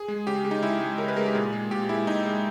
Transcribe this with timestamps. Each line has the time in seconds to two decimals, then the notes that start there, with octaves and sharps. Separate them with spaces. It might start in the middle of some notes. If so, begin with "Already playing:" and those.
Already playing: G#4
0.08 G#3
0.27 C#3 G4
0.45 G#3
0.51 D#4
0.63 C#3 E4
0.81 G#3
0.98 C#3 A#4
1.08 B4
1.16 G#3 A#4
1.26 G4
1.35 A#2 G#4
1.53 G#3
1.71 A#2 G4
1.89 G#3 E4
2.07 A#2 D#4
2.25 G#3